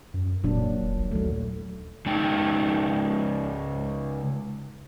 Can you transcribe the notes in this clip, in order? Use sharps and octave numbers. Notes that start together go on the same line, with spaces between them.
F#2
E1 A#2 F#3 D4
A#1
D#2 F#3 A3
C#3 G#3 D#4 G5